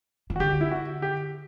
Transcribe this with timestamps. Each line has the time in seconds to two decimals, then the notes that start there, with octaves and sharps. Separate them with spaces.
0.30 E3
0.36 F#4
0.40 D3 G4
0.61 E4
0.71 F#4
1.02 G4